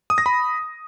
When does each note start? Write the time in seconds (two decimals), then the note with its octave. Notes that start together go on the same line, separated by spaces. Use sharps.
0.10 D#6
0.18 A#6
0.26 B5